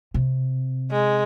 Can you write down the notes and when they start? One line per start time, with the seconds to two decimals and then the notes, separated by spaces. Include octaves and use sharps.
0.14 C3
0.91 G#3